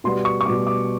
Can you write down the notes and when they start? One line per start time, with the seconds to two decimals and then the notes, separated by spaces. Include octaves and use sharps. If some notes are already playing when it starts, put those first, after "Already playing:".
0.04 B2 G3 B3 C6
0.25 C#6
0.41 C#6
0.45 B2 G3 B3 D6
0.67 D6